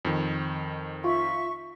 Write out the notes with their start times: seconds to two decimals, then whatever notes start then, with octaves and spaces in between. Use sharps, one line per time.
0.05 F2 D#3
1.04 F4 E5 C#6